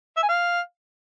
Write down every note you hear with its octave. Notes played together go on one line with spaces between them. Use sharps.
E5
G#5
F5